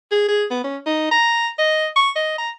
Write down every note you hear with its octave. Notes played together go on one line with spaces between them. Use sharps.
G#4
G#4
B3
C#4
D#4
A#5
D#5
C#6
D#5
A#5